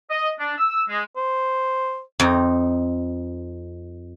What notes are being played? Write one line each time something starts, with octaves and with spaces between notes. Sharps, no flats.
D#5
D4
E6
G#3
C5
F2 D#4